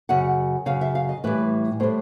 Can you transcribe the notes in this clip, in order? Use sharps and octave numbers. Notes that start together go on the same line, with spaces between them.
F#2 C#3 F#5
F#2 C#3 F5
E5
F5
D#5
A2 E3 G3 B4
A2 E3 G3 C5